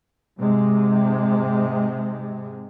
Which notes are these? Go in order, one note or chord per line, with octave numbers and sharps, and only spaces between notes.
G#2 C3 G#3